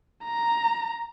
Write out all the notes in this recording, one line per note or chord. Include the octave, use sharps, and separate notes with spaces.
A#5